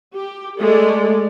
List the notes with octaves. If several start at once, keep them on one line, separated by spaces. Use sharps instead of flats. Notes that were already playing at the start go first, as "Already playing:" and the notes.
G4
G#3 A3 A4 D5